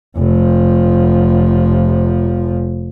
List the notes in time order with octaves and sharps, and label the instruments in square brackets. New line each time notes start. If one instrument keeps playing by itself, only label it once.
[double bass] F1 F3